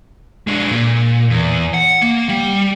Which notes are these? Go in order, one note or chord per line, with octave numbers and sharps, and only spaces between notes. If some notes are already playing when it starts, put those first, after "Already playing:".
G#3 D4
A#2
E2
F#5
A#3
G3